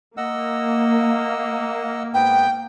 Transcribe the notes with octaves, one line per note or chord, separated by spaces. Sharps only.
A#3 D#5 F#5 E6
G#2 B3 B4 G5